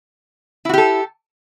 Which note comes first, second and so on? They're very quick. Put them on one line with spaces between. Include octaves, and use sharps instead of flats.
E4 F#4 G4 A4